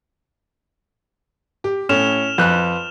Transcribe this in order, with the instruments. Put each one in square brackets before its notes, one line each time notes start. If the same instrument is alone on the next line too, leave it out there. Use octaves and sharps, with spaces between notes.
[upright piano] G4
[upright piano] A2 [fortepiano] C#4 [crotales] F6 E7 F7
[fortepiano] F2 F#6 [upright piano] B4